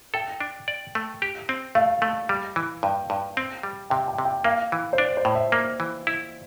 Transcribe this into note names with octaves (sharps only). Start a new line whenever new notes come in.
A4 G5
D4
D5
A3
G4
C4
A3 F5
A3
G3
E3
G2 G5
G2
C4
G3
C3 G5
G5
C3
G5
A#3 F5
E3
C5
D4 D5
C5
A2
E5
A#3
E3
E4